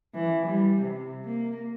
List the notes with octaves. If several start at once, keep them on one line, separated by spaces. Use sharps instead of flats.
E3
G3
C3
A#3